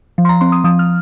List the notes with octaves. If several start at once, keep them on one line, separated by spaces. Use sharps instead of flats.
F3
C6
A#5
C4 C6
D#6
F3 D#6
F6